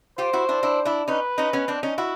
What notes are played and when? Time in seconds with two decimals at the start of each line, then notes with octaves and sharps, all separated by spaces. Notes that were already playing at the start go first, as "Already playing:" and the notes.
0.18 F4 G4 C5
0.33 E4 F#4
0.49 D4 E4
0.63 D4 E4
0.85 D4 E4
1.08 C#4 D#4 B4
1.38 C#4 D#4
1.53 B3 C#4
1.68 C4 D4
1.83 C#4 D#4
1.98 E4 F#4